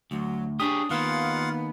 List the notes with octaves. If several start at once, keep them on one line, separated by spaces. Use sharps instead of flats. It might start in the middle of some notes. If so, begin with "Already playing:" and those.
D2 F#3
D4 G4 G#4 C#5 D#6
D#3 A#3 B3 F4 F5 F#5